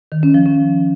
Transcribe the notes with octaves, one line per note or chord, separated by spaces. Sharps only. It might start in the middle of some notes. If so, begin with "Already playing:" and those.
D#3
C#4
F3
C#4